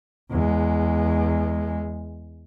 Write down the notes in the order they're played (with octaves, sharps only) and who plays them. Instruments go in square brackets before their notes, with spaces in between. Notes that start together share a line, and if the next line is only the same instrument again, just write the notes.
[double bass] E2 G#3